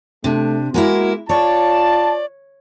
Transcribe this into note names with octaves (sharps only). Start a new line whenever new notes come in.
C3 A3 D4
G#3 A#3 E4 F#4 A#4
F4 C#5 D5 A5